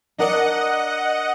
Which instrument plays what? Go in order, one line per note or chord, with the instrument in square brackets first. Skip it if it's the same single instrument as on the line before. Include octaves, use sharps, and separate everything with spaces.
[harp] D4 A#4 D5 [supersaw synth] D#5 F#5